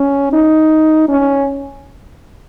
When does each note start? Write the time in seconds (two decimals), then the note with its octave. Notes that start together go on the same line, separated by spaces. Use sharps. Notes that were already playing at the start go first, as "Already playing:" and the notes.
Already playing: C#4
0.33 D#4
1.09 C#4